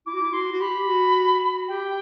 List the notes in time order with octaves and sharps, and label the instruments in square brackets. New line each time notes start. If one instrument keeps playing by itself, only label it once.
[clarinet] E4 [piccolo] D6
[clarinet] F#4
E4
[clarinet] F#4 [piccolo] C6
[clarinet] F#4
[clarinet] G4 [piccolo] B5
[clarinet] F#4
[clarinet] G4 [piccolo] G5